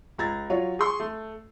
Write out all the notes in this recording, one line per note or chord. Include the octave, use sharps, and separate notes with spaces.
C#2 A#5 G#6 A6
F#3 F4 C#5
G#4 C6 C#6
A3